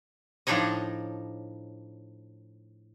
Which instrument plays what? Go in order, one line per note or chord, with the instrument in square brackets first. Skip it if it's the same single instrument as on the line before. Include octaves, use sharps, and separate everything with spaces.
[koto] A2 F3 D4 D#4 C#5 D#5